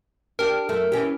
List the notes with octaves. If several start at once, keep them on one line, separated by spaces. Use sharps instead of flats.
D4 G4 A#4
F#2 A3
E3 C#4 G4